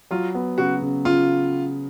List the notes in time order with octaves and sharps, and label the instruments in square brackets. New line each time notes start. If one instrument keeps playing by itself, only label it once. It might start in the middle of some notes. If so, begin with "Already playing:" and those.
[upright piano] F#3 [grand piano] F4
[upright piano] B3
[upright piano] C#3 [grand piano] F#4
[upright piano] C#3
[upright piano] C#3 [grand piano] F4